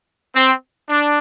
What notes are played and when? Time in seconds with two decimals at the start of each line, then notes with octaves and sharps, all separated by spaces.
0.35 C4
0.89 D4